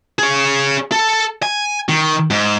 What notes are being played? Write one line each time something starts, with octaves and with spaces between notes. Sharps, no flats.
G#4 C#5
A4
G#5
D#3
G#2